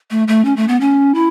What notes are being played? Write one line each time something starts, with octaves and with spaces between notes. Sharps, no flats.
A3
A3
C#4
A3
B3
C#4
E4